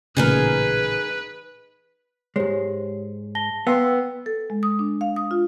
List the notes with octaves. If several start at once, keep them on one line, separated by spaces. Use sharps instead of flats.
A1 A#2 C#3 D#4 G#4 A#4 B4
G#2 G#3 G4 C5 C#5
A5 A#6 G7
B3 F5 G5 C6 E6
A4
G#3
D#6
D4
F5
D#6
F4